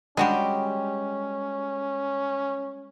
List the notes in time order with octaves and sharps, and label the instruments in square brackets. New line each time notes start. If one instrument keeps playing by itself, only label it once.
[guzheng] G3 G#3 [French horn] C#4 [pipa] D4 F#4 G4